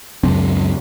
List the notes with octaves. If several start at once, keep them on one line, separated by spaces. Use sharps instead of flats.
C#2 F#2 C4 D4